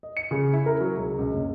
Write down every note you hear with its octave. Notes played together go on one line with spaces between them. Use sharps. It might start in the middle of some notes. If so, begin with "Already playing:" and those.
D#5
C#7
C#3
E4
A#4
F#3
C#2
C#2
F#1